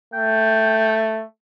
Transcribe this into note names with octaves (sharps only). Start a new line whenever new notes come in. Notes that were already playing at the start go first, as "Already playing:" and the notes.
A3 G5